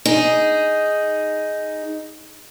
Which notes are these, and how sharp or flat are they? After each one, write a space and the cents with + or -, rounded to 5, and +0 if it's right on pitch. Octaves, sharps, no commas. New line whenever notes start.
D#4 +0 G#4 +0